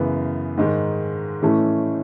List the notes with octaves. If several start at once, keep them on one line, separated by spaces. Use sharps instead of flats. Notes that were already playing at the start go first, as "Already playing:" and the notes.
Already playing: F#2 C#3 E3 B3
G#2 D#3 G#3
A2 E3 A3 C#4